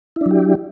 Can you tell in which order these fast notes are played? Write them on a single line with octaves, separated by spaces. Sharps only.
E4 D4 F#3 G4